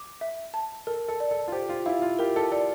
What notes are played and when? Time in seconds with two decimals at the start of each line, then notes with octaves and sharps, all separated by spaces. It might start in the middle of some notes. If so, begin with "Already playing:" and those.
Already playing: D6
0.21 E5
0.54 A5
0.87 A4 A#4
1.08 A4
1.20 D5
1.31 A4
1.48 F4
1.52 G4 C5
1.69 F4
1.86 E4 F5
2.02 F4
2.19 G4 A#4
2.36 A4
2.51 A4 D5